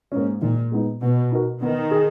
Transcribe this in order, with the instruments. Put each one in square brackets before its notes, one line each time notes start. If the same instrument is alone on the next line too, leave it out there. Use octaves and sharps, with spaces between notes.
[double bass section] G#2 [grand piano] A#3 C#4
[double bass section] A#2 [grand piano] D#3
[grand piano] G#3 B3 D#4
[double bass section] B2 [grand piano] B3
[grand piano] D#4 F#4 A#4
[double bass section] D#3 [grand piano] B3
[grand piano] G#4